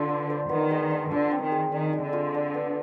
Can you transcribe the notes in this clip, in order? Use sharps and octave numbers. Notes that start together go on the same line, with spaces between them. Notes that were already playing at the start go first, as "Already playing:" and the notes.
Already playing: D3 F4 B4 D5
D4
C5
D#3 B3
G#3
D4
D3 F4
C4
D#3
G#4
D#3 D4
G#3
D3
F4
D4
B3